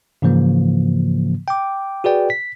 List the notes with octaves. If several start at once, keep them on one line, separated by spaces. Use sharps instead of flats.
G#2 C#3 E3 F3 A#3
G5 D6
F#4 G#4 B4 D5 G5
B6